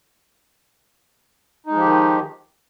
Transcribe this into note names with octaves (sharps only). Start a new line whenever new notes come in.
D#3 F3 G#3 D#4 G4